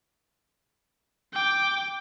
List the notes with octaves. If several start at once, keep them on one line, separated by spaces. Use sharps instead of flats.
G5 D6